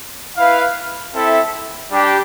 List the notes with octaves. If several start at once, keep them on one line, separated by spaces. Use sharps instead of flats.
E4 B4 F5
C4 E4 A4 E5
G3 D4 G4